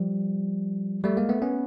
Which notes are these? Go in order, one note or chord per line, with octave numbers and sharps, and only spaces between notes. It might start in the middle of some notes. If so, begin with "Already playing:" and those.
Already playing: F3 G3
G3 A3
G#3 A#3
A3 B3
B3 C#4